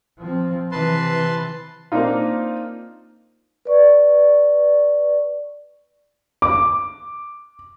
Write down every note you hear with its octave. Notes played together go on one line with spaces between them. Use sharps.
F3 C4
C3 E3 B4 A5 C6
A#3 C4 D4 D#4 F4
B4 D5 C#6
D6